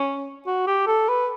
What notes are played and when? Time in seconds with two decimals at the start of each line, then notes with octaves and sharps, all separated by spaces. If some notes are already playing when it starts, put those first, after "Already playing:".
Already playing: C#4
0.46 F#4
0.67 G4
0.87 A4
1.09 B4